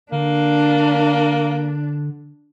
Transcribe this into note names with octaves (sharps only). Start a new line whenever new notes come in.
D3 A#3 D4